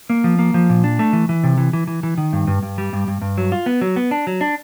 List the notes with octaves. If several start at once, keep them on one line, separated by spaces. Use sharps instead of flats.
A#3
F3
A#3
F3
A#2
D4
A3
E3
E3
C3
E3
E3
E3
E3
D#3
G2
G2
G2
G3
G2
G2
G2
F#3
F4
B3
F#3
B3
D4
F#3
D4